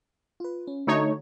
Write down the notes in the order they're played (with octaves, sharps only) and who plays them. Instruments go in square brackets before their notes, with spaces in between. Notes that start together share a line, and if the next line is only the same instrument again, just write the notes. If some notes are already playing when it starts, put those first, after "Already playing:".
[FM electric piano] F4 B4
C#4
[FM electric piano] D3 F#4 [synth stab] A3 D#4 C#5